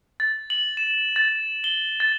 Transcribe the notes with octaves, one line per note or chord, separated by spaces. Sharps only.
A6
F#7
E7
A6
G7
A6